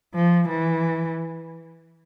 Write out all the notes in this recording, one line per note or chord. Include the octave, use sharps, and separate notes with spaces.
F3
E3